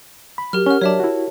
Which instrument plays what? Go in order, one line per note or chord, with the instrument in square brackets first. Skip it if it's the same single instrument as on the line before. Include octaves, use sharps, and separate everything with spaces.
[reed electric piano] B5
[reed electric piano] F#3 [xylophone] G4 A#4 F6
[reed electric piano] C#4 F#5 [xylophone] A#4 F6
[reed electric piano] F#3 D4 D5 [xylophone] C#5 E5 A5
[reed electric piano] E4 F#4